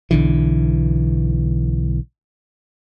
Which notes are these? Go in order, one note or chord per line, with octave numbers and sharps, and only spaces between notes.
B1 D3 E3